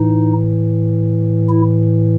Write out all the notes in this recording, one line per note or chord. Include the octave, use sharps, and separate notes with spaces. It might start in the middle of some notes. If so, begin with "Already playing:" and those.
Already playing: A2 E3 D#4
E4